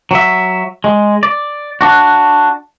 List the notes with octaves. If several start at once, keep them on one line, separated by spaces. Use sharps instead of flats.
F#3 E5
G#3
D5
D4 F#4